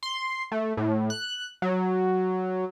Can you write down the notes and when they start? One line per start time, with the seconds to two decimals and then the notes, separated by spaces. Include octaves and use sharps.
0.03 C6
0.52 A3
0.77 A2
1.10 F#6
1.62 F#3